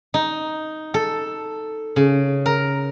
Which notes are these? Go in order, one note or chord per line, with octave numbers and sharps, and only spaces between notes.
D#4
A4
C#3
A#4